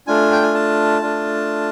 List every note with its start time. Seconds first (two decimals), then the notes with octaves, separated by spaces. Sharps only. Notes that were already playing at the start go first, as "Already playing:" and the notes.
0.07 A3 D4 F4 G#5
0.32 G5
0.43 G#5
0.54 A5
1.02 A3 D4 F4